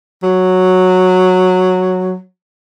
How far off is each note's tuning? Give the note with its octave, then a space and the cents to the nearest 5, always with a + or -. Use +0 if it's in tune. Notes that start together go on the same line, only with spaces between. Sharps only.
F#3 -5